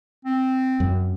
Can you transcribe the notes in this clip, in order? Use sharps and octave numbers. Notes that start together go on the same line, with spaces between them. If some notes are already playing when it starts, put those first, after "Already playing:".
C4
F#2